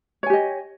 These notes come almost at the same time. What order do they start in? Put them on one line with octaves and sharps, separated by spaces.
C#5 G#5 G4 D#5